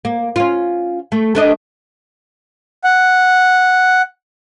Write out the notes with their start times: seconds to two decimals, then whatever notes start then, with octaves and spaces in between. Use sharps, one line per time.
0.05 A#3
0.36 C#4 F4
1.12 A3
1.35 A3 D4 D#5
2.84 F#5